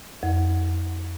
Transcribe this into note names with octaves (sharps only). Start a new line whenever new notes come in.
F2